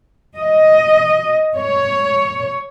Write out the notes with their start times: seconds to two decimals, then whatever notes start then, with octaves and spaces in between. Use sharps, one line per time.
0.38 D#5
1.56 C#5